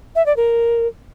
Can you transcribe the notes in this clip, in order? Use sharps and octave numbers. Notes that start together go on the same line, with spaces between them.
E5
D5
A#4